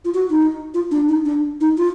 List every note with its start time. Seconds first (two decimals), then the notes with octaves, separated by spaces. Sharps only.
0.05 F4
0.14 F#4
0.30 D#4
0.74 F4
0.91 D4
1.08 D#4
1.25 D4
1.61 D#4
1.78 F4